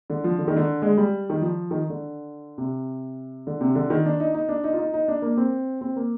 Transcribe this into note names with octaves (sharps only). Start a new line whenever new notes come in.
D3
F3
D3
D#3
D3
G#3
G3
D#3
F3
D#3
D3
C3
D3
C3
D3
D#3
D4
D#4
D#4
D4
D#4
F4
D#4
D#4
D4
A#3
C4
C4
A#3